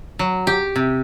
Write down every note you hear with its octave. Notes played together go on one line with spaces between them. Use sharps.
F#3
G4
C3